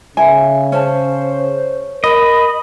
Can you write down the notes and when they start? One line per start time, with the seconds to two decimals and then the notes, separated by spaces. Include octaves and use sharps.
0.17 C#3 E5 G#5
0.72 C#4 C5 A5
2.04 A#4 D#5 B5